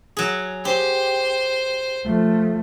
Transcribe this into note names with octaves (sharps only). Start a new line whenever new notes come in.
F#3 G#4
G4 C5
F3 A3